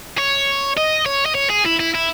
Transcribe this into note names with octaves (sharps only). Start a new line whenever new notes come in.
C#5
D#5
C#5
D#5
C#5
G#4
E4
E4
E4